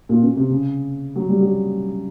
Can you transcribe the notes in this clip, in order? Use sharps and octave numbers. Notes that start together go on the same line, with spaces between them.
A#2
B2
C3
C#3
F#3
G3
F#3